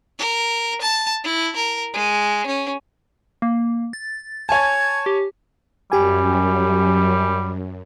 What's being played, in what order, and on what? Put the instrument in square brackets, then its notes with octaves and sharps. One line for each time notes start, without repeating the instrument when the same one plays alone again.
[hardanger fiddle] A#4
A5
E4
A#4
G#3
C#4
[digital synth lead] A#3
A6
[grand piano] C#5 G#5 A5 [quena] G#6
[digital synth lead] G4
[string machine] F#2 [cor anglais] G3 [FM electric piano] G4 G#5